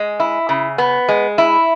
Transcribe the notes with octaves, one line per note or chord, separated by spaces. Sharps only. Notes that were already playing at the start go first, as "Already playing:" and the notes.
Already playing: G#3
E4
C#3
B3
G#3
E4